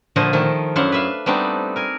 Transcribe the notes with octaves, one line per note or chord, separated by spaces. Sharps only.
A#2 D3 F3 A3 F4 D#5
D#3 F3 A3
F#2 D4 E4 C5 F5 F#5
B4 E5 F5
G3 A3 B3 C4 D4 D#4
A#4 G#5